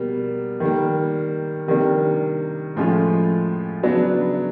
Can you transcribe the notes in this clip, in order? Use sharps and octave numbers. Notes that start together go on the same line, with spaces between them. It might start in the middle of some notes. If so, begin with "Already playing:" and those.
Already playing: B2 G3 A#3
D#3 G3 A#3
C3 D#3 G3 A#3 D4
A2 F3 G#3 C#4 F4
C#3 F#3 B3 D4